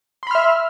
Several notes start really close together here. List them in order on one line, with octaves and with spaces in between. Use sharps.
C6 B5 F6 E5